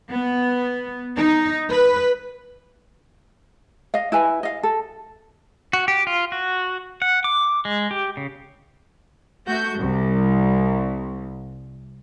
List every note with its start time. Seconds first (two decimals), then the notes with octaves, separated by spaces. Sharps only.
0.11 B3
1.15 D#4
1.70 B4
3.94 D#5 F5
4.12 E4 B4 G#5
4.43 D#5 F5
4.63 A4
5.73 F#4
5.88 G4
6.07 F4
6.32 F#4
7.02 F#5
7.24 D6
7.65 G#3
7.91 G4
8.17 C#3
9.46 A3 F#4 G6
9.77 C2